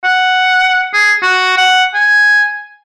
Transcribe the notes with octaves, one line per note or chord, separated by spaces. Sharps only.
F#5
G#4
F#4
F#5
G#5